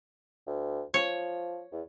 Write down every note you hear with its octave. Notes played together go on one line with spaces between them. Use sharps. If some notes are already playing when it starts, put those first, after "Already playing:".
D2
F3 C#5
E2